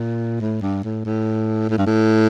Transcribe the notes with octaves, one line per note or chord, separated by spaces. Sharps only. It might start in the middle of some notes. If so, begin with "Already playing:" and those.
Already playing: A#2
A2
G2
A2
A2
A2
G2
A2